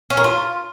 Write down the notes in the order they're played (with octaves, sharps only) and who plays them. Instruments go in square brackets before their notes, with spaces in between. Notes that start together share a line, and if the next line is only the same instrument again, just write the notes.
[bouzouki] C#4
A#4
F4